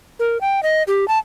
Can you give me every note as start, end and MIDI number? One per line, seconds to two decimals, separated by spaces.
0.19 0.40 70
0.41 0.63 79
0.63 0.83 75
0.88 1.08 67
1.08 1.18 81